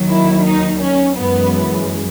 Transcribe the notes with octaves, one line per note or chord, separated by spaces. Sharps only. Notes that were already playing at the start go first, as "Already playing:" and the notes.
Already playing: D#2 D#3 F#3
E4
D#4
C#4
F#2 E3 G#3 B3